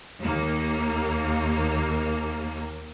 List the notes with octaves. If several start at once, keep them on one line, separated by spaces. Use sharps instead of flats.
D#2 A#3